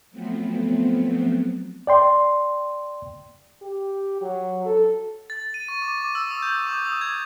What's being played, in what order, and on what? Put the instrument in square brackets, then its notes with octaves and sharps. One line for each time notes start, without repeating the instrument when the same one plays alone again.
[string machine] F3 F#3 A3 B3 C4
[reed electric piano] D5 G5 C6
[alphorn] G4
F#3
A4
[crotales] A6
D#7
C#6
D6
D6
E6
D#6
G6
D6
D#6
G#6